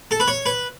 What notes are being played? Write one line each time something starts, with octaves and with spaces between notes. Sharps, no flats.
A4
B4
C#5
B4